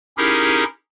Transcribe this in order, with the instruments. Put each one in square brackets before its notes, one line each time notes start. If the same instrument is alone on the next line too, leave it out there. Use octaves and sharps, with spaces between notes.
[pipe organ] C#4 D#4 E4 G4 G#4 A#4